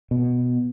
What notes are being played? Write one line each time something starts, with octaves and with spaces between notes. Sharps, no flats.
B2